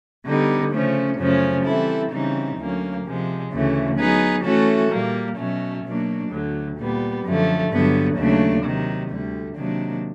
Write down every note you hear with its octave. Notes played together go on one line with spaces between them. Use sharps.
D3 G3 B3 D#4
C#3 F3 A3 C#4
F#2 C#3 F3 A3 C#4
E3 G3 C4 E4 A4
C#3 E3 G3 C4 D#4
D2 D3 F#3 A#3 C#4
C3 F3 G#3
D2 C#3 E3 A3
F#3 B3 D#4 G#4 B4
E3 A3 C#4 F#4 A4
A#2 G3 A#3
B2 F#3 A3 C#4
B2 F#3 A#3 D4
D2 D3 F#3
A#2 G3 B3
F#2 D3 F3 A3
G2 D3 F#3 B3
D#2 C#3 F#3 A3 D4
C3 D#3 F#3
D2 D3 G3
C3 D#3 F#3 A#3 D4